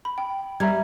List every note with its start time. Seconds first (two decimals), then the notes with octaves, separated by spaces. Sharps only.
0.05 B5
0.18 G5
0.60 G3 E5 A#5 G#6